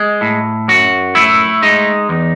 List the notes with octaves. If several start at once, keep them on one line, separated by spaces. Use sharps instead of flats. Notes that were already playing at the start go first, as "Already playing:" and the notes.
Already playing: G#3
A2
F#2 F#4
A3 E4
G#3 D#4
E2